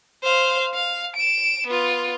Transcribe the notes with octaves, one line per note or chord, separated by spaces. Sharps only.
C5 F5
F5
D7 E7
B3 F4